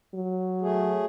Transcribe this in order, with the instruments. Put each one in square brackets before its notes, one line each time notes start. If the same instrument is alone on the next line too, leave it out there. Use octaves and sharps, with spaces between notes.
[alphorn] F#3
[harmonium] A3 G#4